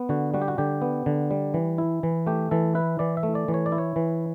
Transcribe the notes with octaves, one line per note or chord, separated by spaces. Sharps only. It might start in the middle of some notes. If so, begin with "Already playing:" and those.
Already playing: B3
D3 F#4
G3 F#4
G4
F#4
D3 G4
B3
D3
G3
E3
E4
E3
A3 G4
E3 A4
E4 B4
E3 D5
E5
A3
D5
E3
C#5
D5
E4
C#5
E3